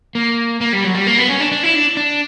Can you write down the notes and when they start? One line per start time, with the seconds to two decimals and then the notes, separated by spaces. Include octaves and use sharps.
0.15 A#3
0.61 A#3
0.73 G3
0.84 F#3
0.95 G3
1.07 A#3
1.18 B3
1.29 C#4
1.40 D4
1.52 D4
1.63 E4
1.75 D4
1.97 D4